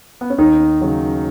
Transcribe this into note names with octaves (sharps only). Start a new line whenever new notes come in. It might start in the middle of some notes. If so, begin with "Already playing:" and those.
B3
C#4
D#2 D#3 D#4
C#3 F#3